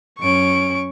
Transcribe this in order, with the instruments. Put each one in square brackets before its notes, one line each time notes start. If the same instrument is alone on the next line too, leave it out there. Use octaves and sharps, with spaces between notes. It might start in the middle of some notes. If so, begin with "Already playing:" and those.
[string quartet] F#2 C#4 [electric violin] C#6 D7